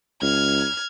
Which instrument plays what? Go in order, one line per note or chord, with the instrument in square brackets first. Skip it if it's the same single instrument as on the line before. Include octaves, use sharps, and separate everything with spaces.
[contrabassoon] C#2 [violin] F6 G#6